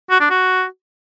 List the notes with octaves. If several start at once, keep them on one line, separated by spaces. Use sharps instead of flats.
F#4
D4
F#4